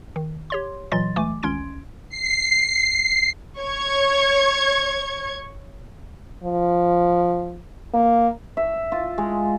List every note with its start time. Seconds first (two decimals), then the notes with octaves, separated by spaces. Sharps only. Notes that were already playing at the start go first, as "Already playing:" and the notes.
0.16 D#3
0.50 G4 C#5 C6
0.92 A#2 E3 F#3 D#5 C6 A6
1.16 C#2 E3 A3 G#5 D6
1.43 G#1 C#2 C#4 C6 G#6 D7
2.09 C7
3.58 C#5 C#6 G#6
6.44 F3
7.94 A#3
8.57 E5
8.92 F4
9.18 G#3